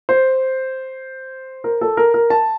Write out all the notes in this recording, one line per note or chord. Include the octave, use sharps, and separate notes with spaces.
C5
A#4
A4
A#4
A#4
A5